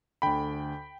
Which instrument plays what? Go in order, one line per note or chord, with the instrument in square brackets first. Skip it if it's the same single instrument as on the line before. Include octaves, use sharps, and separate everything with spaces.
[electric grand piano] D2 D3 G5 B5